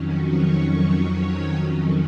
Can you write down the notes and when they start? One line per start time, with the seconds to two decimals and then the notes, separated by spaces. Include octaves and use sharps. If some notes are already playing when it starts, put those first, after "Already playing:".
Already playing: F2 D#3 F#3 C#4
0.21 C#5
0.67 C#5
1.11 C#5